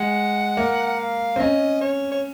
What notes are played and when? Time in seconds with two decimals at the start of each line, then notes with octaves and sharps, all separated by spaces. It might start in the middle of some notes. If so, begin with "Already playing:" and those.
Already playing: G#3 F#5
0.57 A#3
0.86 F#5
0.99 F5
1.36 C4
1.39 C#4 D#5
1.81 C#5
2.12 C#5